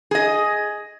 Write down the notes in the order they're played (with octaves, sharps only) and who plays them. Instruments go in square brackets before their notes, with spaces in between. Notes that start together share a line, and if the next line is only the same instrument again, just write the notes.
[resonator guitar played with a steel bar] G#4 D#5